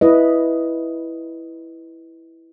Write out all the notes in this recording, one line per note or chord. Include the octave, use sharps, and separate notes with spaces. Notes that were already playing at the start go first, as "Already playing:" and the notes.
E4 B4 D#5